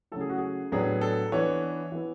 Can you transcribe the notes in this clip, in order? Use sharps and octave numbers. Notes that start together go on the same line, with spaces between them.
C#3 F#3 A3 E4 A4
G#4
F#4
G#4
A2 F#3 B3 D4 G#4
A4
E3 B3 D4 C#5
E3 B3 E4